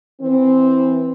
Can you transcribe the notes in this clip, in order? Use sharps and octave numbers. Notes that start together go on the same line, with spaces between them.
E3 C4